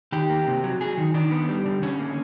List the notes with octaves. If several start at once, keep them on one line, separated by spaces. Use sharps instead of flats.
D#3 G4
A#3
C3
F#3
F#3 G#4
D#3
D#3 D4
B3
G3
D3
D3 C#4
A#3